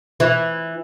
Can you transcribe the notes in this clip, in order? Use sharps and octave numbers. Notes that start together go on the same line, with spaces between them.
E3